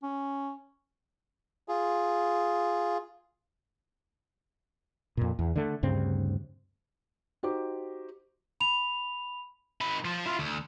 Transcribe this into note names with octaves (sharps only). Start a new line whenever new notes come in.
C#4
F4 G#4
F2 A#2
E2
D3 A3
D2 G2 C#3 C4
D#4 F#4 G4 C5 D6
B5 F7
D#3 B5
F3 F4
E4 F4
D2